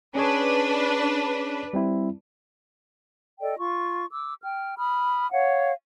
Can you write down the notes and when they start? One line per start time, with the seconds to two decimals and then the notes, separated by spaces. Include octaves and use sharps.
0.15 C#4 D4 G#4 B4 C#5
1.73 G3 C4 E4
3.40 A4 D5 D#5 G5
3.58 F4 C#6
4.11 D6 E6
4.43 G5 F6
4.77 B5 D#6 F6
5.31 C#5 F5 F#5